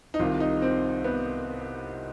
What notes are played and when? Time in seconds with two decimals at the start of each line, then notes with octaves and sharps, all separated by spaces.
0.14 D#4
0.19 C2 C3 D#3 F4
0.40 D#4
0.62 C4
1.04 B3